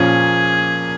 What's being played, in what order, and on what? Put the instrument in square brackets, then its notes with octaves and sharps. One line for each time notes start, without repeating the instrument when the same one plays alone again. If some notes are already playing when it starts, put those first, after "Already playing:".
Already playing: [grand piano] A#2 F3 A#3 C#4 [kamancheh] G#4